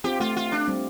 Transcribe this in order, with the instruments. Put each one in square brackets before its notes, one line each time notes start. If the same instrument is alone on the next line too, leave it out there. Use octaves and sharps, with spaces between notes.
[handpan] C4 F4 [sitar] G4
[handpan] A3 [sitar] F4
[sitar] F4
D4
[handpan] G3 C4